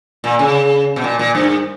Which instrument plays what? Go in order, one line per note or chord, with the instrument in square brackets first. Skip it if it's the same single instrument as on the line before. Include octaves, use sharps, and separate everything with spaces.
[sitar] A#2
C#3
B2
A#2
A#2
G2